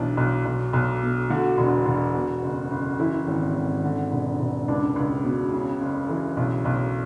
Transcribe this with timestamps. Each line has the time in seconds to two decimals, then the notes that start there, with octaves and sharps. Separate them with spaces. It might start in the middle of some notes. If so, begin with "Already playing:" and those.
Already playing: B1 E3 D4
0.17 B1
0.45 B1
0.73 B1
1.02 B2
1.30 D3 F#4
1.58 E1
1.86 E1
2.15 B2
2.42 F#1
2.71 F#1
2.99 E3 E4
3.28 G#1
3.56 G#1
3.84 D3
4.12 E1
4.40 E1
4.68 C#2 D4
4.96 C#2
5.24 B2
5.52 C#3
5.81 F#1
6.09 E3
6.37 B1
6.65 B1